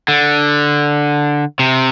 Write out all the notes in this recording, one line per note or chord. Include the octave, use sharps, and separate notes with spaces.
D3
C3